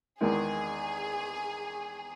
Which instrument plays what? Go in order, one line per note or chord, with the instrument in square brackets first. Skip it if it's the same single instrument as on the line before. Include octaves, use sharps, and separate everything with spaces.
[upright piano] E2 D#3 G#3 [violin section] G#4